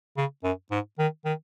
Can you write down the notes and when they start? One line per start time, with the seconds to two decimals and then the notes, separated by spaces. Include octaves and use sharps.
0.17 C#3
0.44 F#2
0.71 G#2
0.98 D#3
1.25 D#3